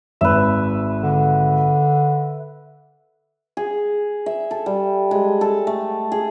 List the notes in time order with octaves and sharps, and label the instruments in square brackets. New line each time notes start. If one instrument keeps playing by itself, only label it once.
[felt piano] G#1 [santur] B4 E5
[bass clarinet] D3
[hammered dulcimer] G#4
E5
A4
G3
G#3
A4
A3
G#4